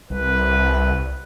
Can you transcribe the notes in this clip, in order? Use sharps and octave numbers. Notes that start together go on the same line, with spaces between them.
C2 B4